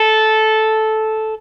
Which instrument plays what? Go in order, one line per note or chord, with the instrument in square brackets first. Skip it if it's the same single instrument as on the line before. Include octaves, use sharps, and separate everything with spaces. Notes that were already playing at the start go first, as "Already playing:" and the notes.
Already playing: [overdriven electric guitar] A4